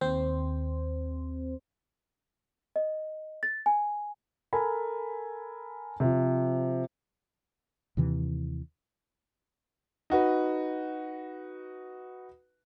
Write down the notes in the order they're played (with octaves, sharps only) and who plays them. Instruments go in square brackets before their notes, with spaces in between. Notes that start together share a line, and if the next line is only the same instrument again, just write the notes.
[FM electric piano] D#2 C4 C5
[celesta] D#5
A6
G#5
[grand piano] A4 A#4 G#5 B5
C3 F3
[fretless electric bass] D#2 C3 E3
[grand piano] D#4 F#4 B4